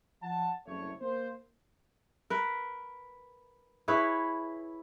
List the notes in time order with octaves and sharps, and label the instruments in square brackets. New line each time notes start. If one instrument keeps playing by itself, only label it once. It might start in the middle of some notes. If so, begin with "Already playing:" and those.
[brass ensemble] F3 F#5 A5
F#1 C2 A3 C#5
A#3 C5
[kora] A#4 B4
E4 G#4 B4 C#5